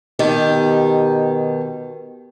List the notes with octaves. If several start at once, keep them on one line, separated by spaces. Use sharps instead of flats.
B2 D#3 G4